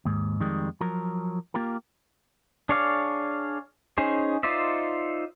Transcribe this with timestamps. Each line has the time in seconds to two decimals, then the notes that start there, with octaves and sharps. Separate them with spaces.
0.05 D#2 G#2
0.40 F2 D#3 G3 G#3
0.81 F3 F#3 A#4
1.54 A#3 F4 G4 A#4
2.69 D4 G#4 C#5 D5 F5
3.98 C#4 D#4 G#4 C5
4.43 D#4 F4 C5 D5 E5